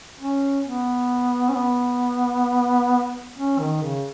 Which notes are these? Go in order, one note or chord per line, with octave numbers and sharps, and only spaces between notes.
C#4
B3
C#4
B3
C#4
D#3
C#3